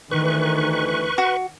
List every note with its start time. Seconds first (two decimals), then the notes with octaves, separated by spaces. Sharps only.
0.11 D2 D#3 E3 B4 C#6
1.18 F#4